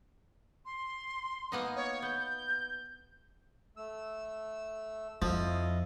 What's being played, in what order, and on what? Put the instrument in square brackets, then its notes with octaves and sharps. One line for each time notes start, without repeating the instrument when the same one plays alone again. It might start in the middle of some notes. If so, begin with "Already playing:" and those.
[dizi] C6
[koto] A#3 B3 D#4
[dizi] C#5
[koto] B3 [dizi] G6
[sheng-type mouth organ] A3 E6
[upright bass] F2 [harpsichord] F3 [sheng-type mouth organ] E4 D#5 F5